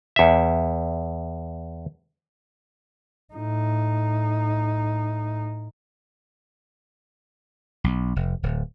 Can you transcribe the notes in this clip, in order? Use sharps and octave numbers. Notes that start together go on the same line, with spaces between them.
E2 E5
A2 D#4
B1
F1
D1